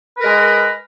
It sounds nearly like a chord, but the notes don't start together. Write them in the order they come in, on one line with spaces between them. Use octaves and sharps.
B4 A#4 G#3